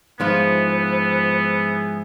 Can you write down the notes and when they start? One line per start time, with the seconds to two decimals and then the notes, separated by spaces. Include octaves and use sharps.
0.20 G#2 F3 B3 E4 F4 G#4 C5